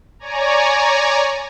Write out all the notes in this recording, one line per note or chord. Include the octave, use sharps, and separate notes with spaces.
C#5 D5 G#5 A#5